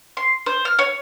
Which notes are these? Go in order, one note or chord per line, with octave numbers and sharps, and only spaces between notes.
C6
C5
F6
C#5